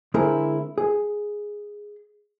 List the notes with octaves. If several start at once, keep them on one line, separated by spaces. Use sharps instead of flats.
D3 G#3 C4 E4 G#4 A#4
G#4